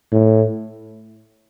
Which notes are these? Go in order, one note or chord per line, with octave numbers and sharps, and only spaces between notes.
A2